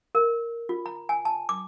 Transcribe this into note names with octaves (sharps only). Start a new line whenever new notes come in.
A#4
F4
A#5
G#5
A5
D6